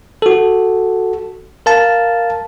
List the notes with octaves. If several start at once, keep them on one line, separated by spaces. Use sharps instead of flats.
F#4 A4
A#4 F5 A5